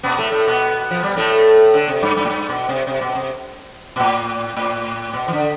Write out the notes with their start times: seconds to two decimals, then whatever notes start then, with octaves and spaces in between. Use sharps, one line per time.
0.03 B2 B3
0.18 A2 A3
0.32 A2 A3
0.47 B2 B3
0.90 F3
1.03 G3
1.17 A2 A3
1.74 D3
1.88 C3
2.03 G2
2.17 G2
2.25 A2
2.30 G2
2.49 B2
2.69 C3
2.87 C3
3.01 B2
3.15 C3
3.96 B2
4.00 A2
4.57 A2
5.13 B2
5.28 E3
5.33 D3